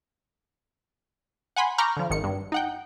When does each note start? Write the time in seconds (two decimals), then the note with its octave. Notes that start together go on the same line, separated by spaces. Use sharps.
1.56 F#5 G#5 B5 C6
1.78 A#5 B5 C#6 D6 F6 G6
1.97 D3 F3
2.10 G#1 D#3 C#7
2.24 G2
2.52 D#4 F#5 G5